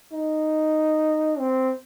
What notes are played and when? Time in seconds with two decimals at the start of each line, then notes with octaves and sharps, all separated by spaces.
0.12 D#4
1.39 C4